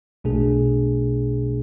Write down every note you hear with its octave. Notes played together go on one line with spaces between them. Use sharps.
B1 B2 A3 D4 G#4